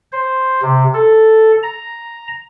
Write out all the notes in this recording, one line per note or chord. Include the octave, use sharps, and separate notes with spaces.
C5
C3
A4
A#5